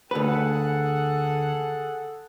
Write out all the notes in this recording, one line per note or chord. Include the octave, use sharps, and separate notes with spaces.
D2 G#4 A4 B4 F#5